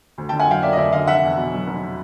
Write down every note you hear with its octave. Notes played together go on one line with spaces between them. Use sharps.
D2
D3 G5 A5
F#5 G#5
F#3 F5 G5
A#3 D5 E5
D#5
D2 D5 E5
D3 D#5 F5
F1 E5 F#5
E2
B2
F#3
F1